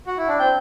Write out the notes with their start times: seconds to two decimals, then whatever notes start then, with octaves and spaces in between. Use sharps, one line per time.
0.07 F#4
0.17 E4
0.28 D4
0.39 C4 G5